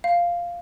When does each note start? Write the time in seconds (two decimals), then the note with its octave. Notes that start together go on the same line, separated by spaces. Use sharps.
0.04 F5